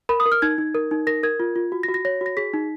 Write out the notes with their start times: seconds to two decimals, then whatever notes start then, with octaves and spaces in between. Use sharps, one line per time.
0.09 A#4 B5
0.20 D#6
0.26 A#4
0.32 F6
0.42 D#4 G#6
0.58 D#4
0.75 A#4
0.91 D#4
1.07 A#4 A#6
1.23 A#4 G#6
1.40 F4
1.56 F4
1.72 F#4
1.83 A#6
1.88 F#4
1.94 A#6
2.05 C#5 A#6
2.21 F#4
2.26 A#6
2.37 G#4 B6
2.54 D#4